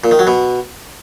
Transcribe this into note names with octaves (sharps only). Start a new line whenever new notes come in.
A#2
D#3
F#3
B2